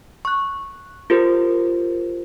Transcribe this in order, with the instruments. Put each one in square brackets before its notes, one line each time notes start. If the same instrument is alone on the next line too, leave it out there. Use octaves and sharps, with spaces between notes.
[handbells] C#6 F#6
F4 G4 A#4 C5